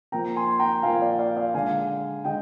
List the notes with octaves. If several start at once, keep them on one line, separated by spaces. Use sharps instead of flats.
A#2 F3 A#3 G5 A#5
G#5 C6
G5 A#5
A#2 F3 A#3 F5 G#5
D5 F5
D5 F5
D5 F5
D3 G#3 F5 G#5
D3 G#3 D#5 G5